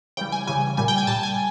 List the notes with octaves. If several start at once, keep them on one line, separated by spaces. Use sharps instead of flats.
C#3 E3 G3 G5
G#5
C#3 E3 G3 G#5
A#2 G3 G#5
G5
G#5
A#2 G3 A5
G#5